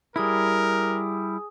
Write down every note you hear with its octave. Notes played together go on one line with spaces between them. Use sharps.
G3 E4 G#4 A#4 G#5 D#6